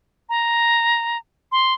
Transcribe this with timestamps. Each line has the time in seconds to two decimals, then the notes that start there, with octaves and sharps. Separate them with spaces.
0.29 A#5
1.52 C6